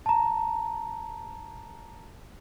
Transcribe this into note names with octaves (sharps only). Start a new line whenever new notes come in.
A5 A#5